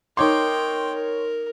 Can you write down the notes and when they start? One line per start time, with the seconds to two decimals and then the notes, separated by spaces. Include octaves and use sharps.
0.17 D#4 A#4 C#5 G5 C6 D6
0.94 A#4